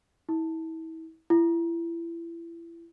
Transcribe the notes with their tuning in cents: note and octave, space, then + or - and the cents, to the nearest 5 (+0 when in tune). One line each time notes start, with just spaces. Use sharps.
E4 -35
E4 +30